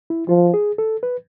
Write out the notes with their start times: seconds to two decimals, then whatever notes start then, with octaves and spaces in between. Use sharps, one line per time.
0.10 E4
0.29 F3 F4
0.54 G#4
0.78 A4
1.03 B4